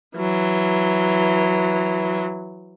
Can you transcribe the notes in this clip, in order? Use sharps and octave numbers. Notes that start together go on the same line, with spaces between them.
E3 F#3